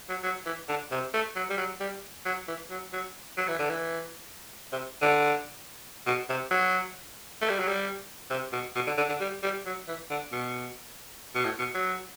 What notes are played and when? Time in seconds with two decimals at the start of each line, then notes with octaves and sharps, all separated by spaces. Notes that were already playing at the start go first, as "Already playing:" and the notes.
0.09 F#3
0.24 F#3
0.46 E3
0.68 D3
0.91 C3
1.14 A3
1.35 F#3
1.50 G3
1.58 F#3
1.80 G3
2.25 F#3
2.48 E3
2.70 F#3
2.93 F#3
3.37 F#3
3.48 E3
3.59 D3
3.70 E3
4.72 C3
5.02 D3
6.06 B2
6.29 C3
6.51 F#3
7.41 A3
7.49 G3
7.59 F#3
7.68 G3
8.30 C3
8.52 B2
8.75 B2
8.87 D3
8.98 D3
9.09 D3
9.20 G3
9.43 G3
9.66 F#3
9.88 E3
10.10 D3
10.32 B2
11.35 B2
11.45 A2
11.59 B2
11.75 F#3